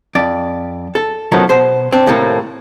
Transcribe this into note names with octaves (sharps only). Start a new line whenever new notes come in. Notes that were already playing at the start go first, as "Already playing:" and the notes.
F2 D5
A4
F#2 B2 D#3 F3 F#3 A3
B2 C5 C6
C4 D4
D#2 A2 C3 A3 A#3